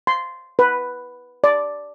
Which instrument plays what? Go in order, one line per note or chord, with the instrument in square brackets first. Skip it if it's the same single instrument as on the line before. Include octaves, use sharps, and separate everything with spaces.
[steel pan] C6
B4
D5